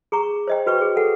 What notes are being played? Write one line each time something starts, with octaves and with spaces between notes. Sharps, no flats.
G#4 A#5 C#6
C5 D#5 G5
F#4 B4 G5 C#6
G#4
A4 F#5